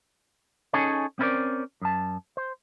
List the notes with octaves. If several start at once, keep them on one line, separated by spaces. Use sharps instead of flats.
C#4 D#4 G#4 A4 C#5
C4 C#4 E4 A#4 C5 D5
F#2 A5
C5